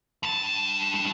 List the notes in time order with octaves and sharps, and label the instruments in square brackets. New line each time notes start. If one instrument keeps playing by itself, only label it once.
[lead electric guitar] G2 A5